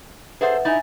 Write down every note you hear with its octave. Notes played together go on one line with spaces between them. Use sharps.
G#4 A4 B4 C5 E5 F#5
D#4 E4 G#5 A6